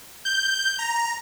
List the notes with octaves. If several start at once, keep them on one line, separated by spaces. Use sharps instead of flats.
G6
A#5